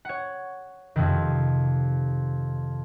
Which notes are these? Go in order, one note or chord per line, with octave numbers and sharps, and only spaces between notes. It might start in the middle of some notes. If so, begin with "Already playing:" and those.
C#5 F#5
F2 C3 D#3